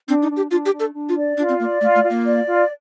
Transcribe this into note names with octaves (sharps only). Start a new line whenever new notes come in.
C4 D4
D#4
D4
G4
D4 F4
G4
D4
A4
D4
F4
D5
D4 F4
C4
A#3 D5
A3 F4
A3
F4
A#3
D5
F4